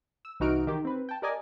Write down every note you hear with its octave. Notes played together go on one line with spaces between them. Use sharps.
E6
C2 E3 D#4 F#4 F6 D7
D#3 G4
C4 B4
G5 A5
G4 A#4 D5 D#5 G#5 D6